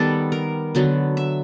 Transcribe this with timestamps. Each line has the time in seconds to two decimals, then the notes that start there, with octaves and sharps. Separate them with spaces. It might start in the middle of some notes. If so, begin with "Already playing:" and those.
Already playing: D#3 G3 B3 A4
0.32 A#4
0.75 D3 F#3 B3
1.17 E5